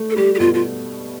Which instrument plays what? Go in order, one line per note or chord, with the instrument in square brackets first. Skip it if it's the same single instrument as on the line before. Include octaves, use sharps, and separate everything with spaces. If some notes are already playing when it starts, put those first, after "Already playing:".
Already playing: [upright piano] A3
[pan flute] A4
[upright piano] G3 [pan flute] G4
[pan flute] G4
[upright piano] B2 [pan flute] F4
[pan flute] F4